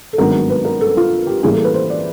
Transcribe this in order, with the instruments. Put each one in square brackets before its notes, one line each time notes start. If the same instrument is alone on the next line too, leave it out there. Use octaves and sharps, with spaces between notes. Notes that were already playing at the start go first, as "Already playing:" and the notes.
[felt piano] A4
G#1 G2 D#3 F#3 B3 A#4
B4
A#4
A4
F4
G4
A2 E3 G3 A#3 G#4
A4
B4
C5
D5